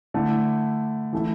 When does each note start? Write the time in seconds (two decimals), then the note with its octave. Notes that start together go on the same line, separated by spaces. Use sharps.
0.14 D3 A3 E4
1.13 E3 A3 E4